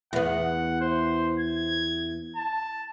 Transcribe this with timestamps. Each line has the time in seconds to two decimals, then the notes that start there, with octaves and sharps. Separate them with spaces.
0.13 E2 B3 F#5
0.81 C5
1.39 G#6
2.36 A5